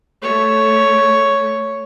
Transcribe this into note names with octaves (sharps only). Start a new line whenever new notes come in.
A3 C#5